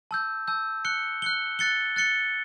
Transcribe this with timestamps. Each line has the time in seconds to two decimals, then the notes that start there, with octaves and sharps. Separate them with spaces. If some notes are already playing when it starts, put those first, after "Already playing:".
0.11 A5 E6 G6
0.48 A5 E6 G6
0.85 F#6 C#7 G7
1.22 F#6 C#7 G7
1.59 F#6 A6 C#7 G7
1.96 F#6 A6 C#7 G7